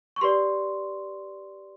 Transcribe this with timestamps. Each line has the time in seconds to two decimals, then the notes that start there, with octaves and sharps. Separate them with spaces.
0.16 C#6
0.21 G4 B4 D5 C6